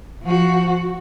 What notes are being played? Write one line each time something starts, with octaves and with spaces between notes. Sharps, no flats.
F3 F#4